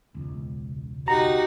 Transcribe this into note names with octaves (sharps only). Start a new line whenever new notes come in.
E1 C#2
D#4 F#4 G4 F#5 A#5